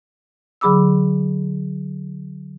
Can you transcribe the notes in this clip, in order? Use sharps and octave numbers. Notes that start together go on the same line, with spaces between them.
D3 F#3 G#4 B5 D6 E6